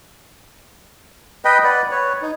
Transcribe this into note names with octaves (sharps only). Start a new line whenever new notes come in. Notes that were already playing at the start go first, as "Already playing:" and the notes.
B4 D#5 G5 B5
B4 D5 F#5
B4 C#5
D#4